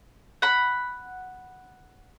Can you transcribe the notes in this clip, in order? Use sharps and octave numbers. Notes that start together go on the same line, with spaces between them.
F#5 B5